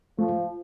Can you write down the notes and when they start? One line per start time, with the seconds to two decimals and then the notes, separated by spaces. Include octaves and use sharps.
0.19 F3 A3